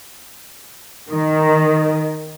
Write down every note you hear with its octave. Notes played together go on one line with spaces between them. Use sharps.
D#3